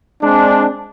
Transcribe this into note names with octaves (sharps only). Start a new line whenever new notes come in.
G#3 C4 D4